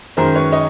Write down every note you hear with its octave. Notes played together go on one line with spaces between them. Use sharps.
F#2 D#3 G#3 A#4 C5
B4 C#5
C#5 D#5